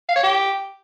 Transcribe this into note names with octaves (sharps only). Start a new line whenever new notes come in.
F5
C#5
G4